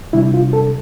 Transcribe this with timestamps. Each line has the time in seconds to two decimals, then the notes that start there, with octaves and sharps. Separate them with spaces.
0.13 C3 G3 D4 E4
0.34 F4
0.53 A4